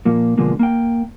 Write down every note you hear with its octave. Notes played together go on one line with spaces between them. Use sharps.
A#2 F3 A#3
B2 D3 F3 G#3 A#3
A#3 G5